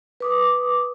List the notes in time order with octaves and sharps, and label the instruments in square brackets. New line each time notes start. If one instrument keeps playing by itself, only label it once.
[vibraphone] B4 D6 D#6